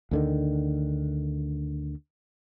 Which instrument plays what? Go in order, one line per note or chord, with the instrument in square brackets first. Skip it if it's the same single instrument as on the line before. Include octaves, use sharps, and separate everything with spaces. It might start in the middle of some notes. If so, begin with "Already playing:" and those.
[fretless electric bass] D2 D3 D#3